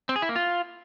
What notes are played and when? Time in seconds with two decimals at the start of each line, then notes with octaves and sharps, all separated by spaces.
0.09 C4
0.16 G#4
0.22 E4
0.29 A#3
0.36 F4